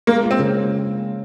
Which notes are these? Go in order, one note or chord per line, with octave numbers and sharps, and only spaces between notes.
G#3 A#3
F4
C4
C#3